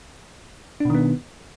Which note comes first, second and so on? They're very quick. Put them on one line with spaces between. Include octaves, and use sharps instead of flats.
D4 B2 D#3 B3